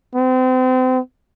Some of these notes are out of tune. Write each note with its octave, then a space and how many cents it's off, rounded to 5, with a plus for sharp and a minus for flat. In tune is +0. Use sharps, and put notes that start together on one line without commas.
C4 -35